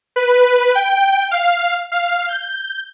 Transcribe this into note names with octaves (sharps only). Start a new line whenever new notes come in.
B4
G5
F5
F5
G6